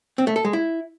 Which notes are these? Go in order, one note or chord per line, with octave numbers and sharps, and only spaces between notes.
C4
A3
A4
G#3
E4